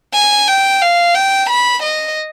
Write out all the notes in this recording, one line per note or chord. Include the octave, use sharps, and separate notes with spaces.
G#5
G5
F5
G5
B5
D#5